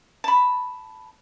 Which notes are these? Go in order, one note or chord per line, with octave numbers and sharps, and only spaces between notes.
A5 B5